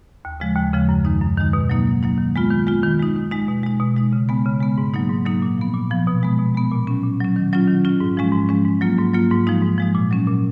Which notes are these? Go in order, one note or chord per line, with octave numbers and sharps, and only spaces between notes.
D#2
C#3 F3 G#3
D#2
C#3 F3 G#3
F#2
D#3 G#3 D#4
F#2
D#3 G#3 D#4
B2
F#3 A#3 D#4
B2
F#3 A#3 D#4
D#3
G#3 B3 F4
D#3
G#3 B3 F4
D#3
G#3 D#4
D#3
G#3 D#4
B2
G#3 D#4
B2
G#3 D#4
C#3
G#3 B3
C#3
G#3 B3
G#2
F#3 A#3 D#4
G#2
F#3 A#3 D#4
A#2
F3 B3
A#2
F3 B3
B2
G#3 B3
B2
G#3 B3
A#2
F#3 C#4
A#2
F#3 C#4
D#3
F#3 C#4 F4
D#3
F#3 C#4 F4
G#2
F3 G#3 C#4
G#2
F3 G#3 C#4
G#2
F#3 A#3 F4
G#2
F#3 A#3 F4
G#2
F3 G#3 D#4
G#2
F3 G#3 D#4
A#2
F#3 C#4
A#2